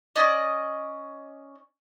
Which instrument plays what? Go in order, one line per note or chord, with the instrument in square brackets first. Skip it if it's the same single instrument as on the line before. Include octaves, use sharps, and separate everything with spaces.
[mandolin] C#4 D5 D#5